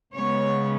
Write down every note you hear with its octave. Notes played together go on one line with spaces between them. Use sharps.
C#3 G#3 B3 C#5